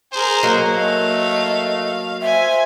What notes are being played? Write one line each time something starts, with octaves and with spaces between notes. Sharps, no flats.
G#4 A#4 C5
F#3 A#3 D#5
A3 F5
C5 E5 G#5